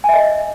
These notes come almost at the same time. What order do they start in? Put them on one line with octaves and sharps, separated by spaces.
G#5 E5 D#5